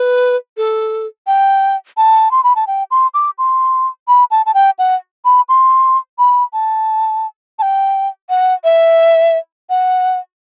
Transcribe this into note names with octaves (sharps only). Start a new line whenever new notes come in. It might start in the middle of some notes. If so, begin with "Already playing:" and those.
Already playing: B4
A4
G5
A5
C6
B5
A5
G5
C6
D6
C6
B5
A5
A5
G5
F#5
B5
C6
B5
A5
A5
G5
F#5
E5
F#5